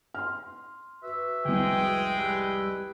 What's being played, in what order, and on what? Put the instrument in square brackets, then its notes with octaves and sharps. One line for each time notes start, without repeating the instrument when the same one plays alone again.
[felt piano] C6 F6
[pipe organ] F#4 B4 [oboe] E5
[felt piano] F1 C2 [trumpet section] G#3 G#4 G5
[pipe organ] G3 G4 E6 [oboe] B4